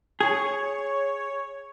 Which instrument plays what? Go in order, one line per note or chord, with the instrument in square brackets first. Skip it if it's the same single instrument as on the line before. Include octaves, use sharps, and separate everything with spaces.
[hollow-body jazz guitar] G#4 [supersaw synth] C#5